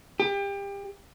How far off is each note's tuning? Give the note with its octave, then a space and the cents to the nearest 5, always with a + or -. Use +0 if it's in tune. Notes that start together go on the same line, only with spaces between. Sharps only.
G4 +30